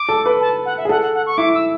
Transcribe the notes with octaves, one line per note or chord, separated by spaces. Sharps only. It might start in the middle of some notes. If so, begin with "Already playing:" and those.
Already playing: D6
A4
B4
A5
F#5
E5
G#4
A4 F#5
F#5
F#5
C#6
E4 D6
E6